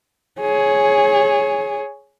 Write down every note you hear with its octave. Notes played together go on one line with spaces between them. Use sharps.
G#4 C#5